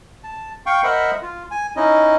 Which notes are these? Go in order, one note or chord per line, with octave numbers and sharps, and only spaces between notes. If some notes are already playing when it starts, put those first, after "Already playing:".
A5
F5 G5 C#6
A#4 C5 D#5 E5 F#5 B5
F4
G#5
C#4 D#4 E4 D#5